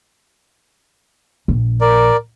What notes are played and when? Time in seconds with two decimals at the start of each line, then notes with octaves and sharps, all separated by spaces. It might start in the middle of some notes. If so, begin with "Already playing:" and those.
1.48 A#1
1.81 A#4 D5